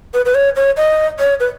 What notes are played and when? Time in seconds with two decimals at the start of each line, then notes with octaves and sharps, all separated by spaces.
0.14 B4
0.25 B4
0.35 C#5
0.56 C#5
0.77 D#5
1.20 C#5
1.40 B4